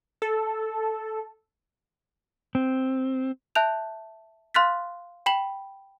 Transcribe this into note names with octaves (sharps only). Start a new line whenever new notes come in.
A4
C4
E5 A5 F#6 G6 F7
F5 C6 F6 F#6 A6 B6
G5 B5 B6 F#7